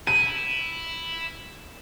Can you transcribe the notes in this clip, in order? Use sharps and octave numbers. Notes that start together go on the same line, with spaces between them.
E4 D#7